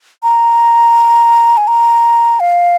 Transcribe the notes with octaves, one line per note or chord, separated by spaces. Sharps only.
A#5
G#5
A#5
F5